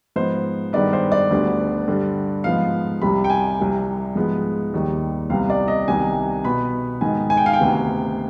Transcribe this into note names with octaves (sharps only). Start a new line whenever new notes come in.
G#2 F3 B3 C5
G2 D#3 G#3 B3 D5
C5
D5
D2 D3 G3 B3
G2 D3 G3
G#2 F3 B3 F5
C2 C3 G3 B5
G5
G#5
C2 C3 G3
G#2 F3 G#3 B3
D#2 D#3 G3
C2 C3 G3 B3 F5
D5
D#5
C2 C3 D#3 B3 G#5
B2 B3 B5
G#2 D#3 B3 G#5
G#5
G5
F5
G5
D2 C3 D#3 B3